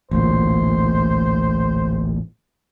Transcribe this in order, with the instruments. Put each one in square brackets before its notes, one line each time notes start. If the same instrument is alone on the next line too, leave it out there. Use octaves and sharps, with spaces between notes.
[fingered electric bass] A1 D2 A#2 [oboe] C5